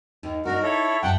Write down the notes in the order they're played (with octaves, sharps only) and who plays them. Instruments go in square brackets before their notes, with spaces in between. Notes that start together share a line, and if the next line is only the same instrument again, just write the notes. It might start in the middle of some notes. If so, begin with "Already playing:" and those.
[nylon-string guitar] D#2 D#3
[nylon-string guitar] D4 D#4 [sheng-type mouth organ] F#4 A#4
[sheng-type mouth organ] E4 A4 C#5
[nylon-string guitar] F#2 E5 A5 [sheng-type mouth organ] F#5 G5